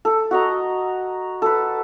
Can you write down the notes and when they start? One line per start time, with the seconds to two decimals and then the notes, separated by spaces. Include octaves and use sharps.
0.05 A4
0.31 F#4 D#5 A#5
1.42 A4 B4